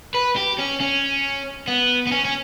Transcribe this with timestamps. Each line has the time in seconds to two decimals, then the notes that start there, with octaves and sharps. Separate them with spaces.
0.14 B4
0.36 G4
0.58 C#4
0.80 C#4
1.68 B3
2.07 B3
2.12 C#4
2.25 C#4